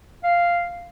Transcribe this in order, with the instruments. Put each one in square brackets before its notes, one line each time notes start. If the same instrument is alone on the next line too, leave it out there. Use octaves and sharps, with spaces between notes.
[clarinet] F5